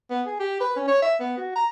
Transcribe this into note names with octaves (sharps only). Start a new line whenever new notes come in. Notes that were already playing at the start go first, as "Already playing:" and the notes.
B3
G#4
G4
B4
C#4
C#5
E5
B3
F#4
A#5